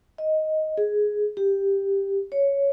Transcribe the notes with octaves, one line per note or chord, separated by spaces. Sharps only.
D#5
G#4
G4
C#5